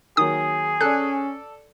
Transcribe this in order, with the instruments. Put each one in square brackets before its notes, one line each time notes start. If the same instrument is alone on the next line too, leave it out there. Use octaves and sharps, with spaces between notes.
[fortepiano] D#3 F#3 A#3 [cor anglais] G#4 [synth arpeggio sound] D#6
[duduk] C#4 [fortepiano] A4 D5 [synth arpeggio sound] F#6